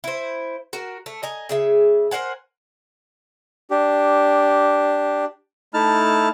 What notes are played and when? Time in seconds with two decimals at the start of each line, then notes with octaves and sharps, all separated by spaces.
0.04 E4 C5
0.73 F#4 A#4
1.06 A3
1.23 D#5 G#5 A#5
1.49 C#3 G#4 E5
2.11 A#4 C5 F#5 G#5
3.71 D4 G4
5.74 A3 D#4 E4 A5 F6